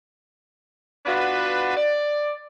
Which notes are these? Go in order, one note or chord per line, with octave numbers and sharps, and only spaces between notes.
B3 D4 F4 F#4 B4
D5